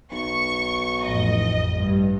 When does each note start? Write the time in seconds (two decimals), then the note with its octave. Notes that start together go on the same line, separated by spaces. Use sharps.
0.12 B1 C#6
1.03 A1 F2 D#5
1.72 G2